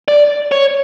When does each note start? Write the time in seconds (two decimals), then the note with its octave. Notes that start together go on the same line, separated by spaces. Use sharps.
0.08 D5
0.52 C#5